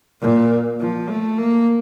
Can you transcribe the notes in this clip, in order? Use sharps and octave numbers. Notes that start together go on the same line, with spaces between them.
A#2
F3
A3
A#3